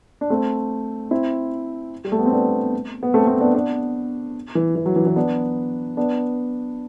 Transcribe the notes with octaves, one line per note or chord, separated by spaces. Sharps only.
D4
A3 C4
C4 E4
G3
A3
B3
C4
B3 D4
B3
A3 C4
A3 C4
B3 D4
B3 D4
E3
E3
F#3
E3
E3
B3 D4
B3 D4